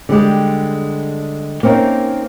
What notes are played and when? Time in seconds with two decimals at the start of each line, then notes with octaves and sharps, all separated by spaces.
0.09 D3 G3 G#3 G4
1.63 A#3 C4 C#4 D#4 A#4 E5